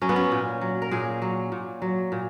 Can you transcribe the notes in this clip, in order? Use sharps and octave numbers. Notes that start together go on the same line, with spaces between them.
F#3 C#4
B3
C#4
A#2
F#3
A#4
A#2 G#4
F#3
A#2
F#3
A#2